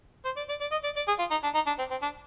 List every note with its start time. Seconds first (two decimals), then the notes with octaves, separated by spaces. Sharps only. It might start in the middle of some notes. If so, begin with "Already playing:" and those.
0.25 C5
0.37 D5
0.49 D5
0.61 D5
0.72 D#5
0.84 D5
0.96 D5
1.08 G#4
1.19 F4
1.31 D#4
1.44 D4
1.55 D#4
1.67 D4
1.78 C4
1.91 C4
2.02 D4